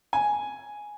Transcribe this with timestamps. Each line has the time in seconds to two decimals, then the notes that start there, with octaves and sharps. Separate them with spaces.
0.13 G#5